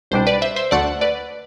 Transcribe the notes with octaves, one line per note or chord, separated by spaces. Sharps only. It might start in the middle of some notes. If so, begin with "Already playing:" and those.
C2 B2 G3 D4 C5
B4 D5
C5 E5
C5 E5
D2 D3 A3 D5 F#5
B4 D5